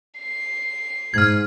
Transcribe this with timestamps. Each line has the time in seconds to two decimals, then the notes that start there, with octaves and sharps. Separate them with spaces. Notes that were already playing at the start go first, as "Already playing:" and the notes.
0.20 C7
1.14 G#2 F6 G#6